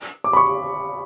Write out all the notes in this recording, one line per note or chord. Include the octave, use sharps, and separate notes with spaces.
D6
B5
C#6